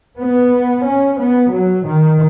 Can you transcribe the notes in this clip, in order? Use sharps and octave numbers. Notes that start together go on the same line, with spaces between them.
B3
C#4
B3
F#3
D#3